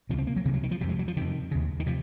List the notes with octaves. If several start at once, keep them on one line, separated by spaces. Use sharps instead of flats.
C#2 C3 F3
C4
A#3
F#3
C#2 C3 D#3
F#3
D#3
F3
F2 C3 F#3
G#3
F#3
F3
F2 C3 D#3
D#2 C#3
D#3
C3 F3